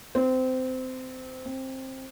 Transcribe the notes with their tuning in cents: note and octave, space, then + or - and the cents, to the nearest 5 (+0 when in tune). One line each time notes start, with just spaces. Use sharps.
C4 -20
C4 +15